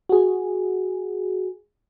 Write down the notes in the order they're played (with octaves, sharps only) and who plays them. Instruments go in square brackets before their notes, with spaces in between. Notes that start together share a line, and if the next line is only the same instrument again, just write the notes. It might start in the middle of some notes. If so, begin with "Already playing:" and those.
[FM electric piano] F#4 G#4